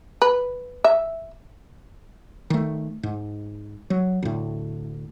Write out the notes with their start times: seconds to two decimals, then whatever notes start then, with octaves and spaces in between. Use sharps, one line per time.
0.22 B4
0.84 E5
2.50 D#3 A3
3.03 G#2
3.90 F#3
4.23 D2 A2